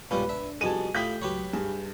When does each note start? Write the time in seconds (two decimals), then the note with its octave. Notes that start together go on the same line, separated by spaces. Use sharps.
0.11 C2 G#2 B2 G3 C#4 F4 B4
0.29 D4 E5
0.61 C2 F2 B2 G#4 G#5 A5 D#7
0.95 A2 A3 E4 F4 G4 D#6 G6 B6
1.22 C#2 F#3 G4 B4 C#5
1.53 G2 G#4